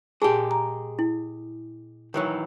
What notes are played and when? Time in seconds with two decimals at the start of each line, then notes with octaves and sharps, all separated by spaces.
0.22 A#2 G#3 G4 G#4 A5
0.51 A#5
0.99 E4
2.14 D#3 E3 F#3